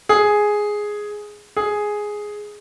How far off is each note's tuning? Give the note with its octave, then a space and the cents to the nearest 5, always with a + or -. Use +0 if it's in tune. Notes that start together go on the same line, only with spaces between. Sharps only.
G#4 +0
G#4 +0